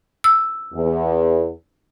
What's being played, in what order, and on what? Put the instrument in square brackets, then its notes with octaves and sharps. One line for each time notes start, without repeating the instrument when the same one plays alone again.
[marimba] E6
[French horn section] E2